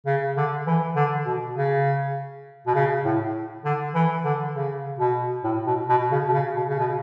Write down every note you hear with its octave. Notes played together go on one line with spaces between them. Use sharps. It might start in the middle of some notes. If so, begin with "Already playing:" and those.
C#3
D3
E3
D3
B2
C#3
B2
C#3
A2
D3
E3
D3
C#3
B2
A2
B2
B2
C#3
B2
C#3
B2
C#3
B2